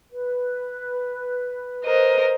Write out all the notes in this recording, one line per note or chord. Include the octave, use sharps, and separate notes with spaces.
B4
A#4 C5 D#5